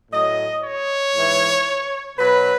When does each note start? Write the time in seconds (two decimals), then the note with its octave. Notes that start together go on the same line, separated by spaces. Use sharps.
0.11 A2 F#3 D#5
0.63 C#5
1.14 G#2 E3
2.17 B2 F#3 B4